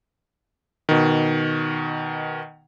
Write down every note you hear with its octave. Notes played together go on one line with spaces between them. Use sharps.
B2 D#3